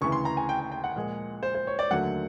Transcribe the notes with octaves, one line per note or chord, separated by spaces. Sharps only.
D2 C#3 E3 C#6
C6
A#5
G#5
G5
G5
G5
F#5
A#2 F3 G#3
C5
C5
C#5
D5
D#2 D3 F#3 A3 F#5